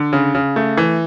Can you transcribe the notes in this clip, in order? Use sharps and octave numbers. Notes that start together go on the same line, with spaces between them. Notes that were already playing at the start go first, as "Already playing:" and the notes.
Already playing: D3
C#3
C#3
A3
E3